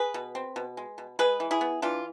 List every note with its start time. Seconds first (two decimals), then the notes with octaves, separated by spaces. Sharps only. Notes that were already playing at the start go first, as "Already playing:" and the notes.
Already playing: G#4 B4
0.14 B2
0.35 C4
0.56 B2
0.77 G#3
0.98 B2
1.19 G#3 G#4 B4
1.40 E3
1.51 E4 G#4
1.61 B3
1.82 E3 D4 F4